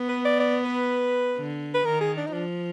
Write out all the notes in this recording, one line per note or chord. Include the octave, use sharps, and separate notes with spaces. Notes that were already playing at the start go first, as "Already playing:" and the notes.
Already playing: B3
B4
D5
D5
B4
D3
B4
D#3 A#4
G#4
D4
D#4
F3 D4